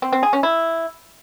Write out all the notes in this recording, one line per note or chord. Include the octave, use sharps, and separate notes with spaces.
C4
C4
G#4
C#4
E4